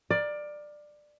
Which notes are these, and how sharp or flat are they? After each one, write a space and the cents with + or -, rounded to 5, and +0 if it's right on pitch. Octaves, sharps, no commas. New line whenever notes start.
A#4 +20 D5 +15